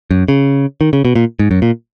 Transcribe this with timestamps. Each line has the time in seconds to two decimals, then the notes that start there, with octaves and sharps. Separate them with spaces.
0.11 F#2
0.28 C#3
0.81 D#3
0.93 C#3
1.05 B2
1.16 A#2
1.39 G#2
1.51 F#2
1.62 A#2